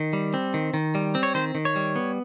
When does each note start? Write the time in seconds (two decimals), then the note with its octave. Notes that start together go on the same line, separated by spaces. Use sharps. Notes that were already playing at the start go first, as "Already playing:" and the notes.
Already playing: D#3
0.13 G3
0.34 C4
0.54 D#3
0.74 D#3
0.95 G3
1.15 C4
1.23 C#5
1.34 D#3 C5
1.55 D#3
1.65 C#5
1.76 G3
1.96 B3